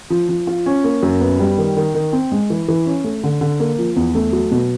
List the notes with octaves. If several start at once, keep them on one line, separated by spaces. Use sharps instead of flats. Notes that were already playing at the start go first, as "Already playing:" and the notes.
F3
F3
F4
C#4
A#3
F#2
B3
G3
D#3
D#3
D#3
C4
G#3
E3
E3
C#4
A3
D3
D3
A#3
F3
E2
A3
F#3
B2